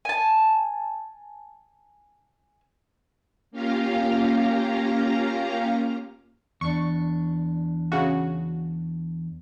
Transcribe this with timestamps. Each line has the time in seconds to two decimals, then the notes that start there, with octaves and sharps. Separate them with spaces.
0.05 G#5 A5
3.51 A#3 C#4 F4 G4 F5 A#5
6.61 E2 D4 C#6
7.92 C#3 F#4